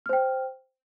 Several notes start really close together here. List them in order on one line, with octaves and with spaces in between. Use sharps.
F6 C5 G5